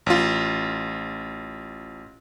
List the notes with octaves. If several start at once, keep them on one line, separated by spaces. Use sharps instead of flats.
A1 F4